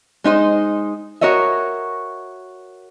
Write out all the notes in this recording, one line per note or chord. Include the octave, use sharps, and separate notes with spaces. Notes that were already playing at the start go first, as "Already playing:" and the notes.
G#3 D#4 C5 D#5
F#4 A#4 C#5 D#5 E5